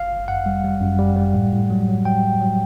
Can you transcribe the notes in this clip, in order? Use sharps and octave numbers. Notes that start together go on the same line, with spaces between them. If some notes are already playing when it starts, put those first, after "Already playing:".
Already playing: G1 F5
G1
F#2 F#5
G3
G3
F#2
G3
G3
A2
A2
F#3
F#3
F#3 G5
A2
F#3